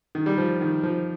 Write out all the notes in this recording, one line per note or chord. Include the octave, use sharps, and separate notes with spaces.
D#3
G3
F3
D#3
F3